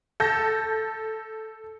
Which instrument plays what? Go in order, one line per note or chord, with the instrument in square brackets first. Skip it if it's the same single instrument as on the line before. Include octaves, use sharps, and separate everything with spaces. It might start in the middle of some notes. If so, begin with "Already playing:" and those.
[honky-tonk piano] A4 G6 A#6